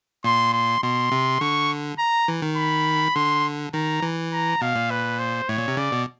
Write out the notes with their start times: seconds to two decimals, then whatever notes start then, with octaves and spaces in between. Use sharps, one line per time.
0.24 A#2 C6
0.53 C6
0.83 B2 C6
1.12 C3
1.41 D3 C#6
1.98 A#5
2.28 E3
2.42 D#3
2.57 B5
3.15 D3 C6
3.73 D#3 A#5
4.02 E3
4.32 A#5
4.61 B2 F5
4.76 A#2
4.90 B4
5.19 C5
5.49 A2 C#5
5.58 A#2
5.68 C3
5.77 C#3 D5
5.92 B2